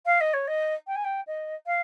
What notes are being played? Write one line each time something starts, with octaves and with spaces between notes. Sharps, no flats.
F5
D#5
C#5
D#5
G5
G#5
G5
D#5
F5